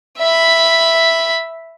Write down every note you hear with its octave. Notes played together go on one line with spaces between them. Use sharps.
E5 B5